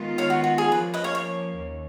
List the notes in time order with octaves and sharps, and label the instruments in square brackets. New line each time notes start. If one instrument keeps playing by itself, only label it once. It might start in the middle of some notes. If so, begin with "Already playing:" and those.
Already playing: [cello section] D#3 G#3 B3 F4
[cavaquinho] C#5 F5
F#4
F#4
G#4
[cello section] F3 A#3 C#4 [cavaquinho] B4
[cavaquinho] B4 D#5
C#5 F5
C#5
[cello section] D#2